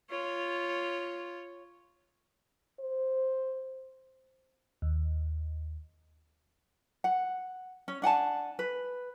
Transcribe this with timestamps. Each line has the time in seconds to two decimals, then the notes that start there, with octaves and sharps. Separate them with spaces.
0.10 F4 C#5
2.80 C5
4.82 D#2
7.04 F#5
7.88 C#4
8.02 D4 F#5 G#5 A5
8.59 B4